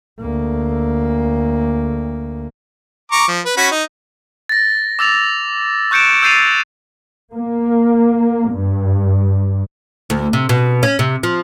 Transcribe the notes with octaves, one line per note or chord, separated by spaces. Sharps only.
D2 A#3
A#5 C#6 D6
F3
B4
C#4 F#4 B5
D#4
A6 A#6
D6 E6 A6 F7
C#6 F#6 G6 C#7 D7 E7
E6 G6 A6 C7 D#7 F7
A#3
G2
D2
C3
B2
C#4
C3
F3